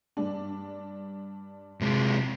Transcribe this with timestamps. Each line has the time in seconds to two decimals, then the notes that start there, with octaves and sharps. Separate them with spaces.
0.17 G2 D4
1.81 C3 G#3